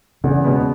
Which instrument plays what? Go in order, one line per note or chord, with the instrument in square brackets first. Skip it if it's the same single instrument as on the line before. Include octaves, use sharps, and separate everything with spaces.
[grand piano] E2 [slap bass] C#3
[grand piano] B2 G#3 B3